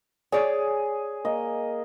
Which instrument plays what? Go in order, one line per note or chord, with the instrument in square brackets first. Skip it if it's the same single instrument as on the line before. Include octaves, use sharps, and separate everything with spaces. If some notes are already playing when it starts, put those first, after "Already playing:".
[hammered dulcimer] G#4 [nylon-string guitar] C#5 D5
[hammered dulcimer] A#3 D#5